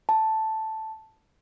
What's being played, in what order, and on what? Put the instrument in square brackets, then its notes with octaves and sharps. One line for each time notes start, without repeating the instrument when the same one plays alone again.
[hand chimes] A5